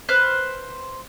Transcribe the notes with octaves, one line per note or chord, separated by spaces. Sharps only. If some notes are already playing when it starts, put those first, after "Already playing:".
B4 C5 F6 F#6